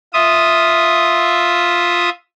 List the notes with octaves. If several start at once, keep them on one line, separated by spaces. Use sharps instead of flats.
F4 E5 D#6